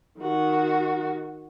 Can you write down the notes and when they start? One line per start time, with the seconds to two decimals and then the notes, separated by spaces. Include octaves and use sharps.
0.20 D#3 F#4